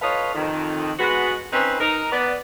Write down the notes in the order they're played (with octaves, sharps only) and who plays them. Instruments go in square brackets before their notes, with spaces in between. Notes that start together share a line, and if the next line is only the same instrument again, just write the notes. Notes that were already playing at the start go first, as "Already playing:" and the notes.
[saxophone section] F4 A4 B4 C#5 D#5 F5
F2 D#3
G#3 B3 F#4
C4 C#4 D#4 B4
D#4 A#4
B3 D5